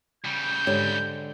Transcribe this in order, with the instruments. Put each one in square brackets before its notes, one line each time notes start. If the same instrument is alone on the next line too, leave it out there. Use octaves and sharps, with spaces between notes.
[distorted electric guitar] C#3 G3 [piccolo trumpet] G6
[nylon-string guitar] G#2 D3 G4 [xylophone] C#5